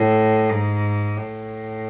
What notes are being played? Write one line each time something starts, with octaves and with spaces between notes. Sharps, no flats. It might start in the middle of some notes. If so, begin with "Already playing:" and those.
Already playing: A2
G#2
A2